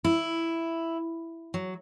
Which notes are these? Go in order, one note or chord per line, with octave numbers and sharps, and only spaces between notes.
E4
F#3